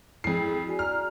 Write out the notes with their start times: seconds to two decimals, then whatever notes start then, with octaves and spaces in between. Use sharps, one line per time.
0.24 F2 E4 G#4 C7
0.67 F#4 D5 G#5
0.79 D5 A#5 F6